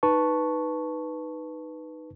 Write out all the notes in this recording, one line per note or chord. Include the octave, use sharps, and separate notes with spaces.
D#4 B4 A5 C#6